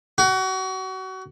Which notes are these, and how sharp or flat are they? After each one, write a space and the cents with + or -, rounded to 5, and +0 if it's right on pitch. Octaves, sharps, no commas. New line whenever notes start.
F#4 +30